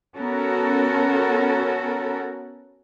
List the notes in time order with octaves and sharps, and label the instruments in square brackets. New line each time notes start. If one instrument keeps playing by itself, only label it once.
[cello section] B3 C#4 F#4 A4 A#4